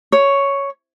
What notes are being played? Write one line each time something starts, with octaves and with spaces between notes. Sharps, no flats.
C#5